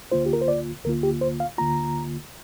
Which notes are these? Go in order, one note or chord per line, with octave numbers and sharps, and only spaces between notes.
D2 D3 A#3 F4 C5
G4
A#4
C5
D5
D2 D3 A#3 F4 A#4
G4
C5
F5
D2 D3 A#3 F4 A#5